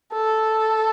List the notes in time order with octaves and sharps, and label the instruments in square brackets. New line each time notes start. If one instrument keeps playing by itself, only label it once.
[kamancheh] A4